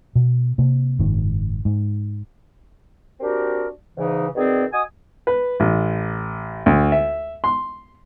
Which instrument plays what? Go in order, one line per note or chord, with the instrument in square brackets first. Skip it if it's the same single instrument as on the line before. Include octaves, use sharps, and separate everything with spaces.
[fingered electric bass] B2
C3 A#3
F#1 G#2 D#3
G#2
[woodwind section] C4 D4 F#4 G4 A#4
E2 G#2 C#3 E3 D#4
B2 D#3 C4 G#4 D5
F#4 D#5 G#5 D#6
[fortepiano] B4
A1
D2
E5
C6